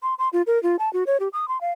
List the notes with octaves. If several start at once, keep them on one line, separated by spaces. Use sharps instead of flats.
C6
C6
F4
A#4
F4
A5
F#4
C#5
G4
D#6
C6
F5